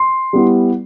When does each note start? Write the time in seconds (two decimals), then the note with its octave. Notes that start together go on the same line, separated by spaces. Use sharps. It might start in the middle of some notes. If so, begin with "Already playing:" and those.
Already playing: C6
0.33 G3 B3 E4